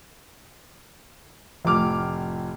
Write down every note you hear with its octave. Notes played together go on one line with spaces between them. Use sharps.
F1 A2 D6 F6